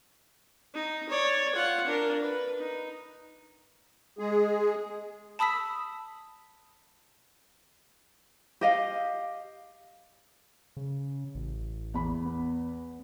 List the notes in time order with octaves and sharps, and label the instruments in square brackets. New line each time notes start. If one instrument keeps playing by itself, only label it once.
[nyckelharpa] D#4
C#5 D5
F4 F#5
D4 A#4
B4
D#4
[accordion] G#3 G#4
[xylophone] A5 B5 D#6 E6 B6
[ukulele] G4 D#5 F5
[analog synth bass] C#3
A1
[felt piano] E2 B5
[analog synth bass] B3